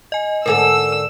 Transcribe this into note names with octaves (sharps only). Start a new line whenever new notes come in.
D#5 G#5
G#2 D3 A4 A#4 G#5 E6